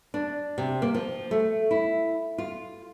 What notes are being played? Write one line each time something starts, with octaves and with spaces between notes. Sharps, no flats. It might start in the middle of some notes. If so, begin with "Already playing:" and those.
D4
C3
A#3
F3
A3
E4
F4